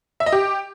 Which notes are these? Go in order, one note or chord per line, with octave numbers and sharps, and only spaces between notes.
E5
D#5
G4